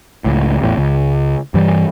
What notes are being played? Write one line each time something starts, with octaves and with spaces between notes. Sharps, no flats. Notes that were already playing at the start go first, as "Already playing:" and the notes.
C#2 A2
A1 E2 A2
C#2
G2 E3 G3